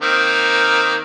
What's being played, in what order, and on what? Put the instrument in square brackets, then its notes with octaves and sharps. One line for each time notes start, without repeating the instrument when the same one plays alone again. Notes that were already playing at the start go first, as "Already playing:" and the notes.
[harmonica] D#3 A#3 C4